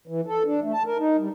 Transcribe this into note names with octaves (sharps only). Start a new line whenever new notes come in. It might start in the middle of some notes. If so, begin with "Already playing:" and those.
E3
A4
D4
A3
A5
A#4
D#4
G3